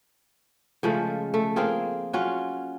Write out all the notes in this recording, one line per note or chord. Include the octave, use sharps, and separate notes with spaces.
C#3 F3 G#3 A3
A3
A#3 C4 F4 G#4
F#3 C#4 F4